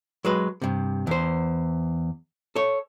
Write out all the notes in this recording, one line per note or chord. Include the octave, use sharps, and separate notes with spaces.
F#3 G#3 B4
G2 C3
E2 C5
A4 C#5